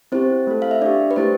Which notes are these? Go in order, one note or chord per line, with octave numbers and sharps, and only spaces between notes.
C4 E4 G4 C5
A3 E4 A4
F5
E5
D4 G4 D5
B4
A3 E4 G4 C5